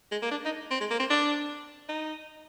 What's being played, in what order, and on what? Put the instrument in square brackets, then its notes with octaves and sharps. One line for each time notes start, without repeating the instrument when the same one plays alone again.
[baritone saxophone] G#3
A#3
D4
D#4
C4
G#3
A#3
C4
D4
D#4